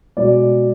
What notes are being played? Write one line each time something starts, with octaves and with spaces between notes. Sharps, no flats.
B2 G#3 D5